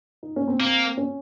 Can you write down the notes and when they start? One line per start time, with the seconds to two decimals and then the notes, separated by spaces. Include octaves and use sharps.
0.23 D#4
0.36 C#4
0.48 C4
0.60 A#3 C4
0.97 C#4